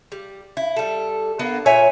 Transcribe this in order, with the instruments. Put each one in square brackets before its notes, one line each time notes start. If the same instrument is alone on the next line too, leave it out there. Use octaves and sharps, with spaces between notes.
[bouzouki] G3
E4
G3 A4
A#3 B3 D4
A#2 C#5 E5 G#5